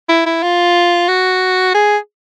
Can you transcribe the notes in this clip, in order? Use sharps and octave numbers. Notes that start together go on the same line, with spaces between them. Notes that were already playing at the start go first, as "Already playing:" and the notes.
E4
E4
F4
F#4
G#4